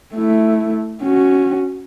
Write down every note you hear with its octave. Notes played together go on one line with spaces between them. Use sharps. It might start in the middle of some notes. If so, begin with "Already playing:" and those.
A3 E4
C#4 F#4